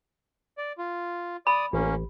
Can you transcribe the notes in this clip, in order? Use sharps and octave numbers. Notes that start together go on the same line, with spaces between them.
D5
F4
D5 B5 D#6
A1 A#3 C#4